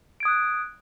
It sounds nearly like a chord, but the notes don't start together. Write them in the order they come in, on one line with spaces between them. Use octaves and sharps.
D7 G#6 D#6 F#6